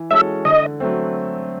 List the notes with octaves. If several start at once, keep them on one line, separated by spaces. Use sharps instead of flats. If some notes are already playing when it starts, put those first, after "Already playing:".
Already playing: E3
G#3 C#4 F#4 A4 E5
D3 D#5
F#3 A3 C4